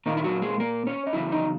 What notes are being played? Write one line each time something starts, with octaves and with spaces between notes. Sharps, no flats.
A#2 D#3 A#3 D#4
E4
F#3 F#4
G#3 G#4
A#3 A#4
C#4 C#5
D#5
E2 C#3 F#3 E4 E5
D#4 D#5